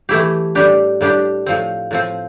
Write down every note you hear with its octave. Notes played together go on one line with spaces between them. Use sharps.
E3 A3 E4 G4
A2 G3 D4 G4
A2 G3 D4 G4
A2 F3 C4
A2 F3 C4